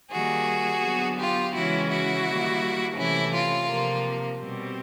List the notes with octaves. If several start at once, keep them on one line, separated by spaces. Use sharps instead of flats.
D#3 G3 A#3 F#4 G#4
D3 F#3 B3
F4 G4
C#3 E3 G#3 C#4 E4 F#4
E4 F#4
D#3 G3 A#3
C3 E3 A3 C#4 E4
F4
C3 F3 A#3
B2 G3 C4